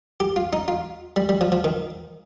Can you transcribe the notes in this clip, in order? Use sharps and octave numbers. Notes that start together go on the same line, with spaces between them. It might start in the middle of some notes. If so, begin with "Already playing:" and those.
G4
F4
D#4
F4
G3
G3
F3
F3
D#3